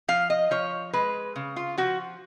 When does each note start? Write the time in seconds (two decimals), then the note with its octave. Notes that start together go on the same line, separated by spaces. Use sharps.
0.08 F3 F5
0.30 D#5
0.51 F3 C#5
0.93 G#3 B4
1.36 C#3
1.56 F4
1.78 F3 F#4